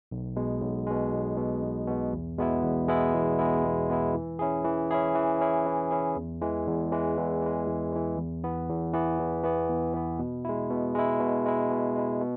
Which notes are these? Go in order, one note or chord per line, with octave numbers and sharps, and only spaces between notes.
B1
B2 G#3
B1
B2 G#3
B1
B2 G#3
B1
B2 G#3
E2
B2 G#3 B3 E4
E2
B2 G#3 B3 E4
E2
B2 G#3 B3 E4
E2
B2 G#3 B3 E4
E3
C#4 E4 G#4
E3
C#4 E4 G#4
E3
C#4 E4 G#4
E3
C#4 E4 G#4
E2
E3 G#3
E2
E3 G#3
E2
E3 G#3
E2
E3 G#3
E2
E3 B3
E2
E3 B3
E2
E3 B3
E2
E3 B3
B2
G#3 E4
B2
G#3 E4
B2
G#3 E4
B2
G#3 E4
B2